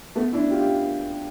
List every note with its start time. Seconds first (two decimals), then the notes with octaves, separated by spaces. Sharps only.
0.15 A3 B3
0.33 D4 E4
0.50 F4 G4
0.61 G4